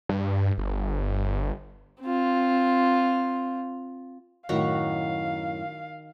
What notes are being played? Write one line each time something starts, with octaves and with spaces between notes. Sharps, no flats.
G2
G1
C4 F4
F#2 A2 D#3 E4 F#4 F5 A#5